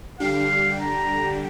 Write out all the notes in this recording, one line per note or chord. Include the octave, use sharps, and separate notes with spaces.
D3 G3 D4 G4 F5
A#5